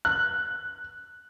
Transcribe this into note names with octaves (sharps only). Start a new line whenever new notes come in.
F#6